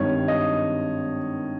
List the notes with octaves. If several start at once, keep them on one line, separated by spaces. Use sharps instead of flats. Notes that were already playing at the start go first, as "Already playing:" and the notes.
Already playing: G#1 G2 D#3 C#5
D#5